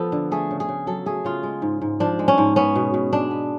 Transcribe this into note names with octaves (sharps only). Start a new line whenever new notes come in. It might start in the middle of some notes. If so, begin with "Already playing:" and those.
Already playing: F3 B3 A4
D3
A3 G#4
C#3
G#4
C#3
F#3 A4
A3 G#4
C#3 F4
G#3
G#2
G#2
F3 D4
G#3
C#4
G#2
B3 C#4
B2
B2
G#3 D4
B3